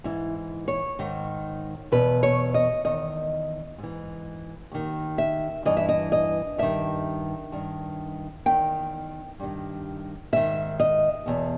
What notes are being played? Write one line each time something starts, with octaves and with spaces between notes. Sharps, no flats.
G#2 E3 E4
C#5
G#2 D#3
E2 B2 B4
C#5
D#5
E2 D#3 D#5
G#2 E3
D#2 D#3
E5
G2 E3 D#5
E5
D#5
D#5
G2 D#3 E5
G2 D#3
E2 D#3 G5
G2 D#3
G#2 D#3 E5
D#5
E2 B2